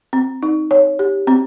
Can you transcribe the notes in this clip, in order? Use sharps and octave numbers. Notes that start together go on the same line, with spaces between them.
C4
D#4
C#5
G4
C4